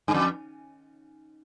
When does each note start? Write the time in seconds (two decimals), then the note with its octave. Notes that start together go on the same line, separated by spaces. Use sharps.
0.08 G2
0.14 F2